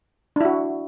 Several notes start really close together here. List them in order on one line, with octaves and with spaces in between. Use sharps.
D4 E4 F#4